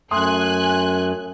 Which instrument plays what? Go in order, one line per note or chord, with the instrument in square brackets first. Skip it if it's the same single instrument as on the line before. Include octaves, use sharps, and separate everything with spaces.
[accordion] F#2 [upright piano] A3 C6 D#6 [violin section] G#5 F#6